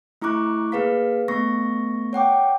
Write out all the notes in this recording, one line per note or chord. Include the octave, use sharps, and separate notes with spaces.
A3 E4 A#5 C#6 D6 F#6
A#3 G#4 B4 F5 B6
A3 B3 C#6 A#6
C#5 F#5 G5 D6